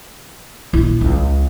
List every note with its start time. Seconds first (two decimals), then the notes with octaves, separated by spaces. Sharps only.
0.73 A#1 E4
1.01 C#2